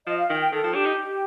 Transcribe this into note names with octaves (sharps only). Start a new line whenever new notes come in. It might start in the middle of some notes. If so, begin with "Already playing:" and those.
F3 D#5
F5
D#3 G5
G5
D#3 A4
F3
D4 G4
D#4